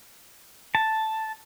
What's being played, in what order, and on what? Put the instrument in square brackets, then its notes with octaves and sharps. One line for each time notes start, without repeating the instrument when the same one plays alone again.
[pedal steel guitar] A5